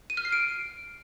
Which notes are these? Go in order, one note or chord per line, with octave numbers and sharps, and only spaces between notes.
D#7
F6
C7
D7